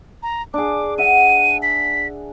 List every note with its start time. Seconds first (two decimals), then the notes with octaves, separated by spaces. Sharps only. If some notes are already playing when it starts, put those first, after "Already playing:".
0.23 A#5
0.54 D4 G#4 D6
0.98 E5 F#5 D#7
1.62 B6